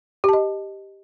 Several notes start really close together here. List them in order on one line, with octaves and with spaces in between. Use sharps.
G4 A5 D#5